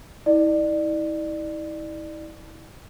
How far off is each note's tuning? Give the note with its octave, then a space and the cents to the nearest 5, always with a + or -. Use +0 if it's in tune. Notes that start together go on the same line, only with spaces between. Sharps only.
E4 -40 D5 +25